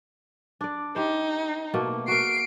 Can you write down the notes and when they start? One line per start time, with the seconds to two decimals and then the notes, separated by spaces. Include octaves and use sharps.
0.61 D4 D5
0.96 D#4 G4 C5
1.74 B2 A3 A#3
2.08 F#4 A#4 C7 D7